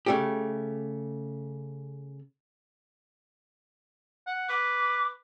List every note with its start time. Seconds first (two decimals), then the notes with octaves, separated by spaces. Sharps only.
0.06 C#3 A3 G4
4.27 F#5
4.49 B4 D6